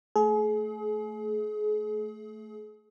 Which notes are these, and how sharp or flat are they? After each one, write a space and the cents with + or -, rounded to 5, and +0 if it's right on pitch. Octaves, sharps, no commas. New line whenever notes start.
A3 +0 G#4 +35